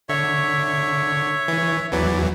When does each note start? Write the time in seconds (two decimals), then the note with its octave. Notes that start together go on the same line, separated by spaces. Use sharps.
0.09 D3 C#5 E5 C#6
1.48 E3
1.93 E2 E3 F#3 B4 D5